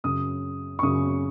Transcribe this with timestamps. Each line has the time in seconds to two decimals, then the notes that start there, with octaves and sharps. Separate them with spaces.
0.04 F#2 C#3 D#6
0.79 C#6
0.83 F#2 C#3 D#6